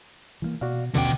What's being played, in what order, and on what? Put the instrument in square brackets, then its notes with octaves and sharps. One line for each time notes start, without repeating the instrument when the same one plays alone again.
[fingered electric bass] E3 G#3 A#3
[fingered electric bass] B2 [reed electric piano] F#4 D5 F5
[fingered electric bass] A1 D#2 C#4 [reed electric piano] B2 F#5 D6 [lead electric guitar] D3 G5